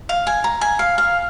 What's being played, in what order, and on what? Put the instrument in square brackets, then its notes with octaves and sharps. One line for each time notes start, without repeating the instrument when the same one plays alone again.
[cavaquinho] F5
G#5
A#5
G#5
F5
F5